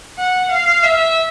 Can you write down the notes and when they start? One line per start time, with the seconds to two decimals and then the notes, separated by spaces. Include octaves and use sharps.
0.18 F#5
0.51 F5
0.83 E5